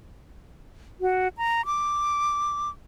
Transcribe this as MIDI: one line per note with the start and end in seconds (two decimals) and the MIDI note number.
1.01 1.28 66
1.37 1.65 82
1.66 2.69 86